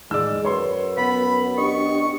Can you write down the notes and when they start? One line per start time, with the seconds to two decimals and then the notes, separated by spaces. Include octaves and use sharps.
0.11 E2 A2 D#3 G#3 D5 E6
0.45 F#2 B4 C#5 C6
0.97 B3 B5
1.58 D4 G4 D#5 C#6